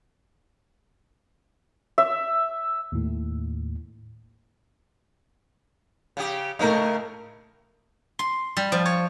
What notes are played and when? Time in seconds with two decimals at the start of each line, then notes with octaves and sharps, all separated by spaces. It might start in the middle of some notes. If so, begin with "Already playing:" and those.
1.98 E5
2.92 D#2 A2
6.17 C#3 G4
6.59 A2 C#3 A3 D#4 A#4
8.19 C6
8.57 G3
8.72 F3
8.85 C#5